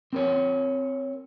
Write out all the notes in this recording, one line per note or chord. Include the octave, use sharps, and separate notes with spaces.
C4 A#4 C#5